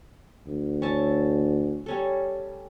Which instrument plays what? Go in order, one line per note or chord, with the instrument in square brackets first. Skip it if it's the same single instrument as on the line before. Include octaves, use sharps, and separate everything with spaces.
[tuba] D2
[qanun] C#4 E4 A5
G3 C#4 A4